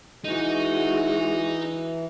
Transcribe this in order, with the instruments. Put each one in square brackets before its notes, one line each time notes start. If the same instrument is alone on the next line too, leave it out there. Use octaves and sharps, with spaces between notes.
[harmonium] E3 [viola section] G#3 F#4 [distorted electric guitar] D#4